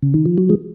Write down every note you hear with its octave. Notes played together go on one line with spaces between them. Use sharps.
C#3
D#3
F3
F#3
F3 G#3